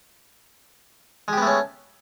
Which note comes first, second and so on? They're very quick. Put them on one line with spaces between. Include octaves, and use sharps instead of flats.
G#3 G4 B3 A3 C#4